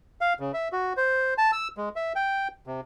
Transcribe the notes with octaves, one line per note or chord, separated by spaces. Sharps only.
F5
C#3
E5
F#4
C5
A5
E6
G#3
E5
G5
C3